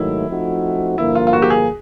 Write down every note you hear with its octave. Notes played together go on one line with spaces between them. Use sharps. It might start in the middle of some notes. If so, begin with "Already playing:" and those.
Already playing: G#2 D#3 F#3 A3 E4
F3 A3 C4 D#4 F#4
G2 D3 F3 A#3 E4
F4
F4
F#4
G4
G#4